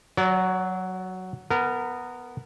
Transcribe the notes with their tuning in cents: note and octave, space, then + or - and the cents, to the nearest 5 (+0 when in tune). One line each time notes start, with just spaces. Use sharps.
F#3 +0 D5 -40
B3 +0 A#4 -20